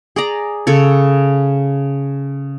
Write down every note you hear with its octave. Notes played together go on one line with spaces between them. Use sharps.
G#4 D5 A#5
C#3 A4 C#5